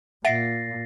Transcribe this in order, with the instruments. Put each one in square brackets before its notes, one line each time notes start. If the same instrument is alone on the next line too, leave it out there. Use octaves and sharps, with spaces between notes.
[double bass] A#2 [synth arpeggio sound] E5 F#5 D7 [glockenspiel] A6 A#6 C7